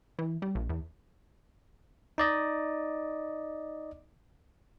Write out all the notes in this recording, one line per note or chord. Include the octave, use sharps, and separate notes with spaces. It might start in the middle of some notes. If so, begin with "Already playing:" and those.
E3
G3
A#1
E2
D#4 D5 D#5